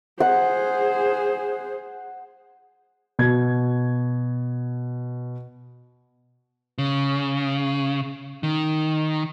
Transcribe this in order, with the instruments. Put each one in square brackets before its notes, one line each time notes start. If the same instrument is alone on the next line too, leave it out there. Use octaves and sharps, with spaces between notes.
[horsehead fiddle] G#4 C5 [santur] F#5
[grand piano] B2 G#6
[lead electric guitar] C#3
D#3